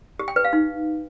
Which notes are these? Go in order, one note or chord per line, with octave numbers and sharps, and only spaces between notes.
G4
G5
B4
F5
D#4